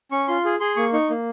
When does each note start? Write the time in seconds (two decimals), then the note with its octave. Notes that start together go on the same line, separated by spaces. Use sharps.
0.12 C#4 C#6
0.28 F4 C6
0.45 G#4
0.60 G#4 C6
0.76 A#3 C#6
0.93 D#4 C#6
1.10 A#3